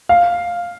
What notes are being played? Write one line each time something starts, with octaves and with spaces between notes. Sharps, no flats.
F5